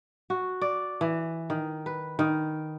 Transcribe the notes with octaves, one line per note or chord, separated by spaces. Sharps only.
F#4
D5
E3
D#3
B4
D#3